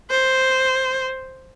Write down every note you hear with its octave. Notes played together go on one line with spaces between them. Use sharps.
C5